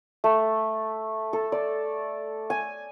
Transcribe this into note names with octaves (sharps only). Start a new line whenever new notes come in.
A3
A4
D5
G#5